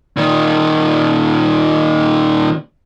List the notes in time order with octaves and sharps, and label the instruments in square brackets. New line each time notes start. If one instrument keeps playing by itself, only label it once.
[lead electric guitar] A#2 D#3